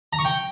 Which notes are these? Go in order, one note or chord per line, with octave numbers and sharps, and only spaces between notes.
A#5
C#6
G5